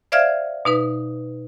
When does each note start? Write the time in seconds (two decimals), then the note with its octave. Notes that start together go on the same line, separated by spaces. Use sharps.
0.12 C5 D5 E5 F5 F6 G#6
0.65 B2 D#4 B4